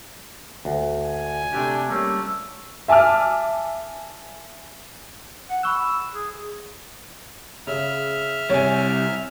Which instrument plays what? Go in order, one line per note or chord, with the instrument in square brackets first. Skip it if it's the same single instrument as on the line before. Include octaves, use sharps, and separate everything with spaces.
[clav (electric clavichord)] D2
[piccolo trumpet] G#5
[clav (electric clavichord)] C3 A3 G4 [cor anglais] D4
[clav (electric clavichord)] G3 A#3 C#4 [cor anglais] A3
[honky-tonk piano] E5 G#5 A5 D6 F6
[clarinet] F#5
[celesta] B5 C#6 F#6 [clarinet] E6
[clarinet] G#4
[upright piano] C#3 [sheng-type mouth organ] E5 F6
[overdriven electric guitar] C3 G3 [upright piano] C#5 G#5